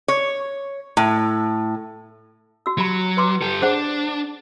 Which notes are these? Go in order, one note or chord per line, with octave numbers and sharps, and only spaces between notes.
C#5
A2
F#4 E6
F#3 G4 B5
B4 C6 D6
G4 A4
D4 G#4 C5 F#5